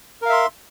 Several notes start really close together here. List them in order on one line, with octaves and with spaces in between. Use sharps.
A#4 F5 E5 C6